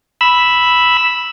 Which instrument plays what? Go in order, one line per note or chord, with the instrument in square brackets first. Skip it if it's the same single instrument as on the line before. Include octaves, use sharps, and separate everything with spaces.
[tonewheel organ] B5 E6